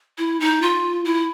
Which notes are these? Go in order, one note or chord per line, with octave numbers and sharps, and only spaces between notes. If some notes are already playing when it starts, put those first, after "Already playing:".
E4
D#4
F4
E4